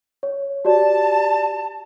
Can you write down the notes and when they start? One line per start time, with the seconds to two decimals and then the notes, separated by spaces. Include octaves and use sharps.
0.23 C#5
0.65 F#4 G4 D5 A5